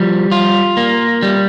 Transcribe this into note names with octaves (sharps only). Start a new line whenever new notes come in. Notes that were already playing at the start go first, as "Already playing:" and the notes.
Already playing: F3 G3
F4
A#3
G3